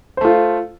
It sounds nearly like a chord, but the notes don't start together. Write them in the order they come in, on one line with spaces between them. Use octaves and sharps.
C5 A3 F4